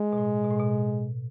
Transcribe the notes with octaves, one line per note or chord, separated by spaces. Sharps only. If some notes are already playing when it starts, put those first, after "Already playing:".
Already playing: G#3
B2
A2
B2
A2
B2